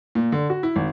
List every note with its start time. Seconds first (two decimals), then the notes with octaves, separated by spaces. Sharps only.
0.15 A#2
0.32 D3
0.50 F#4
0.63 E4
0.76 G#1